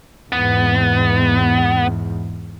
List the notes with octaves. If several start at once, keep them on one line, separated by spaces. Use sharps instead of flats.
E2 G#2 B3